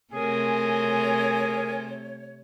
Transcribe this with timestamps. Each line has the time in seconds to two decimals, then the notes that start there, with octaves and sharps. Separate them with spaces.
0.13 C3 A3 C4 G#4 A#4 C#5 G#5